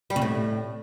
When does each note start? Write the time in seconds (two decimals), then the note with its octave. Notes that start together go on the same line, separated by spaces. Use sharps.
0.10 G3
0.16 C#3
0.22 A2